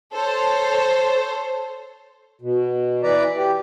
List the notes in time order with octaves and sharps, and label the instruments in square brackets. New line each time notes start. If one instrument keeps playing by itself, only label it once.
[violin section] A4 C5 C#5
[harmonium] B2
E3 B4 D5 A#5
G4